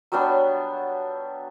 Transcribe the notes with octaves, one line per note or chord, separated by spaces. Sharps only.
F#3 G3 B3 D4